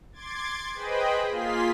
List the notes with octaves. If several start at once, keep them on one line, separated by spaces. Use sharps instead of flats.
C6 D6 G#6 A6
G#4 B4 C5 D#5 G5 B5
A#3 F4 G#4 F5 C6 B6